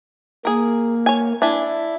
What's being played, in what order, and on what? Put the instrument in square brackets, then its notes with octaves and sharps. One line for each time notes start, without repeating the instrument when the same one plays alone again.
[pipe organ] A#3 [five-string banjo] G#4 A#4
[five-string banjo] C#5 G#5
[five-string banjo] D4 E5 G#5 [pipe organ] E4